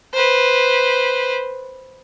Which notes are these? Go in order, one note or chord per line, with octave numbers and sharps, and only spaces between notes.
B4 C5